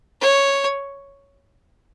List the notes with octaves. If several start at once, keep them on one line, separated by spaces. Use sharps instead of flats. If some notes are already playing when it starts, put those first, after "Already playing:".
C#5